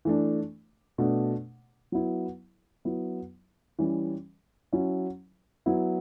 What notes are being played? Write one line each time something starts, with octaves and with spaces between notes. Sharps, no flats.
E3 A3 D4
B2 A3 D4
F#3 B3 E4
F#3 B3 E4
E3 G3 C#4 E4
F#3 C#4 E4
F#3 B3 E4